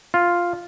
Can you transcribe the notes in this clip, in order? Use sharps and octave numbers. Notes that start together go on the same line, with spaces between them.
F4